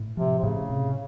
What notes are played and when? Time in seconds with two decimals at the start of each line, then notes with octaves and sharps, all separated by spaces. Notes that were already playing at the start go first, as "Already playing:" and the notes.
Already playing: A2
0.17 C3 F3
0.39 C3
0.43 A2 C#3
0.70 C3